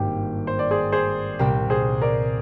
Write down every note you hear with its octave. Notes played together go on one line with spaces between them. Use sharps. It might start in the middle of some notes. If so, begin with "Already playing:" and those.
Already playing: G#1 G2 D#3 A#3 G4
C5
D5
G#4 C5
G#4 C5
C2 A#2 G3 C4 G4 A#4
G#4 C5
A#4 D5